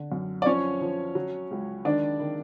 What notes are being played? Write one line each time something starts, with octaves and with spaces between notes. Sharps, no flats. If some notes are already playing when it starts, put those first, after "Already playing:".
Already playing: D3
F#2
D5
F3 C#4 C#5
F3
F#3
C#2
D#3 D4 D5
D#3